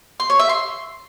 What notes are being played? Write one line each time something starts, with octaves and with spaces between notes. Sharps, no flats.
C6
C#5
E5
C6